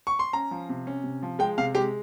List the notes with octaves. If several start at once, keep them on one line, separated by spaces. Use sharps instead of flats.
C#6
C6
C#4 A#5
F3
C3
C#4
C3
F3
G#3 G5
C3 F5
G#3 G4